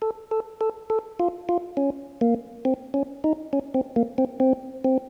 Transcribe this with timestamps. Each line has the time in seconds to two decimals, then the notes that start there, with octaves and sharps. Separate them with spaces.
0.02 A4
0.31 A4
0.61 A4
0.90 A4
1.20 F4
1.49 F4
1.77 C#4
2.21 A#3
2.65 C4
2.94 C#4
3.24 D#4
3.53 C#4
3.74 C4
3.96 A#3
4.18 C4
4.40 C4
4.85 C4